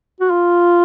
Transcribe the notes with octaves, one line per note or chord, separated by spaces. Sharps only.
F#4
F4